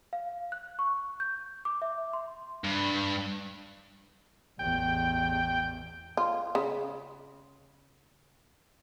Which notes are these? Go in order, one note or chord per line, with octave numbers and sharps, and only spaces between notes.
F5
F#6
C#6
G6
D6
E5
C6
G2
A1 E2 G5
F4
C#3